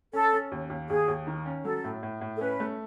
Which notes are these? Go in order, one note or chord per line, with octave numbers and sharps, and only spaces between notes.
C#4 A4
C#4
D#2
D#2
D#2 G#4
D#2
D#3
C#4
F#3 A4
A2
A2
A2
A4
C#4 B4
A3